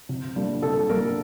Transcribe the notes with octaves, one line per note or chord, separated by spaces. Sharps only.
C3
G3 A#3 D4
C3 A4
G3 A#3 D4 A#4